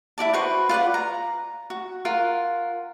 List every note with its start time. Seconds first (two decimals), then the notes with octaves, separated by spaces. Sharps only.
0.18 E4 F#4 D5 A5
0.34 F#4 B4 C5 C#6
0.69 F4 B4 D5 F#5
0.94 A#5
1.70 F#4
2.05 F4 A#4 F#5